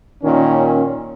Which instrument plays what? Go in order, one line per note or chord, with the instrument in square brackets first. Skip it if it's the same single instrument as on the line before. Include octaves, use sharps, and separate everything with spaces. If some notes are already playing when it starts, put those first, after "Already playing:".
[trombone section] A#2 D#3 C#4